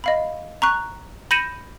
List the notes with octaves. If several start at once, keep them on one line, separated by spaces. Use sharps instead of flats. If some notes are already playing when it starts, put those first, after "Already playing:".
D#5 F5 B5
A#5 C#6 F#6
B5 G6 A#6 C#7 D#7 E7